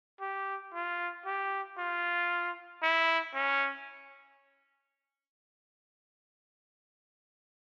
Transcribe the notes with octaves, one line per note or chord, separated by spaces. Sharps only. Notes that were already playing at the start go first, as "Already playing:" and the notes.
G4
F4
G4
F4
E4
C#4